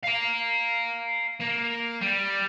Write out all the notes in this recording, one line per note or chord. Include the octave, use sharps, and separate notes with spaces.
F5 A#5
A#3
G3